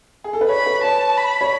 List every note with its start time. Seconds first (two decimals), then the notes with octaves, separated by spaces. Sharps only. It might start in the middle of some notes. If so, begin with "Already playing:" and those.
0.24 G#4
0.33 A4
0.41 B4
0.49 C#5 B5
0.66 B4
0.84 C#5 A5
1.18 B5
1.41 C#5